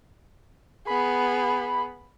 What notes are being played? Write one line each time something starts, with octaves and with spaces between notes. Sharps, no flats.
B3 G#4 B5